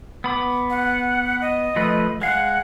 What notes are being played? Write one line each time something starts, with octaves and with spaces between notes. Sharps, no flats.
B3 B5 D6
F#5
D#5
F3 A3 B4
G#3 F5 F#5